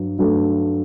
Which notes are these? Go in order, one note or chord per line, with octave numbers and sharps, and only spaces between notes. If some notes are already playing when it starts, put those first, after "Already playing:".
Already playing: G2 F#3
G2 F#3 A3